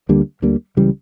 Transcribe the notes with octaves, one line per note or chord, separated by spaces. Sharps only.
D2 D3 G3 A#3
D2 D3 G3 A#3
C#2 C#3 E3 G3